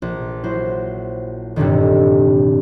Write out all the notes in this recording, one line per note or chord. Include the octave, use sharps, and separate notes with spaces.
A#1
F#3 E4 C5
F1 G2 A#2 D3 D#3